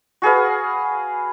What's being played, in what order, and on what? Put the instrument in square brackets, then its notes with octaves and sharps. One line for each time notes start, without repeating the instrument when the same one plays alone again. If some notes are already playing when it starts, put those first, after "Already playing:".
[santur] F#4 G#4 B4 F5